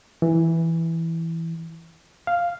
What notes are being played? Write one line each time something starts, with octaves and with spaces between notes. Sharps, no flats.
E3
F5